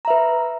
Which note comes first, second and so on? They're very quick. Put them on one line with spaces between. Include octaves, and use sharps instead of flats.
A#5 E5 B4